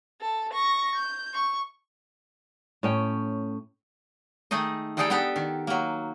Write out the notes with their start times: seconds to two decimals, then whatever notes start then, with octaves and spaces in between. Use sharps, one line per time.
0.21 A4
0.53 C#6 A#6
0.96 G6
1.34 C#6
2.83 A2 C#4 G5
4.51 D#3 A3 D#4 G#4 D#5
4.97 E3 G3 D#4 G#4 A4 G5
5.10 B3 D4 G4 A4 G5
5.36 D#3
5.67 F#3 A#3